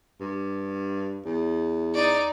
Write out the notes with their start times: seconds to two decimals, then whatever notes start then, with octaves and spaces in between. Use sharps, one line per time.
0.20 G2
1.25 E2
1.94 D#4 D5